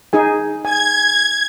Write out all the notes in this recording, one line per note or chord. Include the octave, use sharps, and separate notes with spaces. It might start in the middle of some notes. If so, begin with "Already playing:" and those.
D#4 G#4 G#5
G#5 G#6